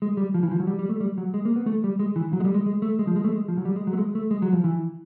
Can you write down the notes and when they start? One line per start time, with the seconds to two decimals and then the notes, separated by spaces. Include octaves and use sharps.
0.02 G#3
0.17 G3
0.34 F3
0.43 E3
0.51 F3
0.60 F#3
0.67 G3
0.79 G3
0.89 A3
1.00 G3
1.18 F#3
1.34 G#3
1.45 A#3
1.56 B3
1.66 A3
1.84 G3
1.99 G#3
2.16 E3
2.33 F#3
2.40 G#3
2.44 G3
2.54 G#3
2.66 G#3
2.82 A3
2.99 G#3
3.07 F3
3.16 G#3
3.24 A3
3.32 G#3
3.48 F3
3.58 F#3
3.65 G3
3.76 G#3
3.87 F#3
3.93 A3
3.98 G#3
4.15 A3
4.31 G#3
4.42 F#3
4.53 F3
4.64 E3